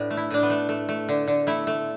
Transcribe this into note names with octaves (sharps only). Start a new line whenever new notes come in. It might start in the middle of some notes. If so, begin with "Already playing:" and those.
Already playing: A2 B3 D4
A3
E4
A2 D4
B3
A3
A3
A3
D3
D3
A3 E4
A3